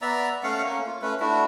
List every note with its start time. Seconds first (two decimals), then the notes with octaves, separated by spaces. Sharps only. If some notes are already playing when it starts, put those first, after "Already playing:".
0.02 B3 D5 E5 A#5
0.43 A3 C#4 F5 F#5
0.64 A#3 C#4
0.86 F4
1.02 A3 C#4 B4
1.20 A3 D4 E4 F#4